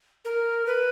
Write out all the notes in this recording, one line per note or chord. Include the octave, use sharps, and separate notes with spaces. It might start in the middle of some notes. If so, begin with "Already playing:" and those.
A#4
B4